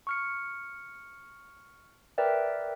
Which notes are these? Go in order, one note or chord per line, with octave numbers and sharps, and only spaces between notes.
C#6 F6 C#7
A#4 B4 D5 E5 G5